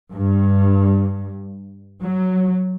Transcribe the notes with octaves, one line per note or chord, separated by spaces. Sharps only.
G2
F#3